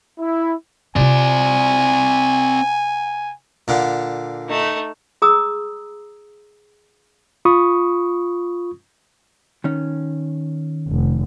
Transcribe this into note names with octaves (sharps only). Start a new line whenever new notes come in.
E4
C3 C4 F4 D5 G#5
A#2 D3
A3 D#4
G#4 A#5 D#6 E6
F4 B5 C#6 D#6
D#3 C#4
F1